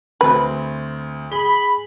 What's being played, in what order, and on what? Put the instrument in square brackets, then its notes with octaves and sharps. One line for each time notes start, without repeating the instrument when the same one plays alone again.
[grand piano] D2 C4 [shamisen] B4
[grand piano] G#4 G7 [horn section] B5